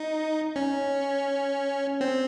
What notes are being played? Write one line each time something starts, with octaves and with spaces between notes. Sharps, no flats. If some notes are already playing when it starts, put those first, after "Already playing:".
Already playing: D#4
C#4
C4